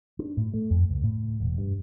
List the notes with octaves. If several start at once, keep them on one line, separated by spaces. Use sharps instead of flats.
D4
A2
A3
F2
C#2
A2
E1
G2